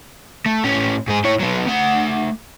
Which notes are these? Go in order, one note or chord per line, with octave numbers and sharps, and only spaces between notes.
A3
A2 C#4
G#2 G#4
E4 C#5
F#3 B3
A3 F#5